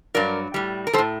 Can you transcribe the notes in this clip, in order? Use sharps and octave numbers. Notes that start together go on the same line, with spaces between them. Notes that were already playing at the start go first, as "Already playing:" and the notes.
G2 F#3 A#4 D5
A2 G3
A#4
G3 A4 C5
A2